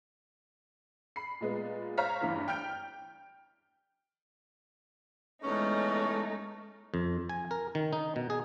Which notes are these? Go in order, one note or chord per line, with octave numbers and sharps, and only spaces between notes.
B5 C7
A#2 G#3 B3
C5 C#5 F5 A#5 F6 B6
E2 G2 E3
G5 F6 G6 D7
E2 G#3 A3 C#4 D#4
F2
G#5
A#4
D#3
D#4
B2
G#4